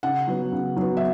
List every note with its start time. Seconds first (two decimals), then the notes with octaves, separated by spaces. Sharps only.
0.03 C#3 F#5
0.27 F#3 B3
0.52 C#3
0.77 F#3 B3
0.97 E5